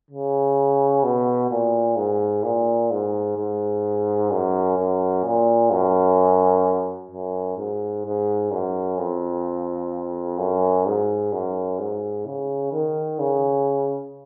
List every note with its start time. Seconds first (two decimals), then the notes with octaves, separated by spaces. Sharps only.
0.10 C#3
1.04 B2
1.51 A#2
1.96 G#2
2.43 A#2
2.91 G#2
3.37 G#2
4.31 F#2
4.78 F#2
5.24 A#2
5.72 F#2
7.11 F#2
7.58 G#2
8.06 G#2
8.52 F#2
8.98 F2
10.38 F#2
10.86 G#2
11.32 F#2
11.79 G#2
12.26 C#3
12.73 D#3
13.19 C#3